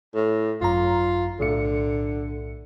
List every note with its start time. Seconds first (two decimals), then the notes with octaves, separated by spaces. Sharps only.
0.15 A2
0.61 G#1 F#2 F4 A#5
1.40 B1 A2 D3 C#7